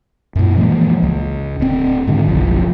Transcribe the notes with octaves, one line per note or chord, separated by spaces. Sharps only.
F#2 A#2
E3 F3 G#3 A#3
C#2
D1 C4
G#2 D3 D#3
F#1 B1 F3